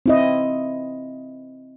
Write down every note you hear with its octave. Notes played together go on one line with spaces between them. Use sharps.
C4 E4 D#5